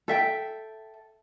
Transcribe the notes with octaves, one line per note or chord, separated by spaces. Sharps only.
A4 E5 G5